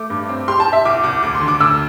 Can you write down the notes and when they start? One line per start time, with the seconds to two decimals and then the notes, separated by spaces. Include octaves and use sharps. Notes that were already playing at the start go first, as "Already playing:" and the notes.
Already playing: A3 D6
0.10 G2
0.29 C4
0.48 G4 C6
0.60 A5
0.67 G4
0.73 E5
0.85 C2 D6
1.03 C2 D6
1.23 D2 D6
1.35 C6
1.41 D3
1.48 D6
1.60 D2 E6